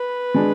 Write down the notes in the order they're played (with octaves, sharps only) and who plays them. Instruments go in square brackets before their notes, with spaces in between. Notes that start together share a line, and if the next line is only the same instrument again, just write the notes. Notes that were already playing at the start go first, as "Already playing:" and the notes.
Already playing: [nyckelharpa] B4
[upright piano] G#3 D4